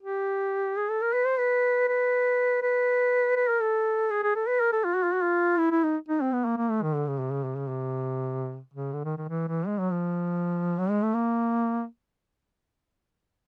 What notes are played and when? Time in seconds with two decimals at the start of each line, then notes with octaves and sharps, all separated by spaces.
0.02 G4
0.77 G#4
0.89 A4
1.02 A#4
1.13 B4
1.26 C5
1.39 B4
1.88 B4
2.62 B4
3.36 B4
3.48 A#4
3.61 A4
4.10 G#4
4.23 G#4
4.35 A4
4.47 B4
4.60 A#4
4.72 A4
4.84 F4
4.95 F#4
5.03 F4
5.14 F#4
5.23 F4
5.58 E4
5.71 E4
5.84 D#4
6.09 D#4
6.21 C4
6.32 B3
6.45 A#3
6.57 A#3
6.70 A3
6.82 D#3
6.95 D3
7.07 C#3
7.19 C3
7.32 C#3
7.44 C3
7.57 C#3
7.69 C3
8.74 C#3
8.93 D3
9.04 D#3
9.17 D#3
9.29 E3
9.48 E3
9.67 G#3
9.78 F#3
9.91 F3
10.78 F#3
10.90 G#3
11.02 A3
11.14 A#3